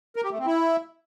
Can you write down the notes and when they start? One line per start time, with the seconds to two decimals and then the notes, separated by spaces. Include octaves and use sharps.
0.16 A#4
0.24 G4
0.31 A3
0.39 C4
0.46 E4